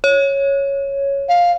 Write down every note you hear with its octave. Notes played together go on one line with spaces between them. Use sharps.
C#5
F5